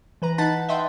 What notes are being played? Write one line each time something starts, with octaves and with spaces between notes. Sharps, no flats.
E3 B4 A#5
D#4 F#5 A5 B5 A6
D#5 E5 F#5 G5 C6